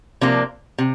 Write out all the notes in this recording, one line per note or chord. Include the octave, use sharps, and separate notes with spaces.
C3 F3 A#3 D4
C3